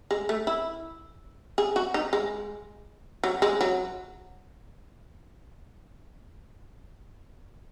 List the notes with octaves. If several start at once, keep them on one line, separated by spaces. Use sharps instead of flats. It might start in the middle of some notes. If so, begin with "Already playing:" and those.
G#3
A3
E4
G#4
F#4
D#4
G#3
F#3
G#3
F#3